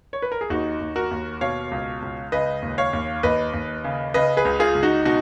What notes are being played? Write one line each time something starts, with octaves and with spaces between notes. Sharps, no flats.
C#5
B4
A#4
G#4
D#2 D#4 F#4
D#2
F#4 A#4
D#2
B2 C#5 F5
C#2
C#2
C#3 B4 D#5
D#2
C#5 F5
D#2
D#2 B4 D#5
D#2
C#3
C#3 B4 D#5
G#4 B4
C#2
F4 G#4
C#2
D#4 F#4
B2 D#4 F#4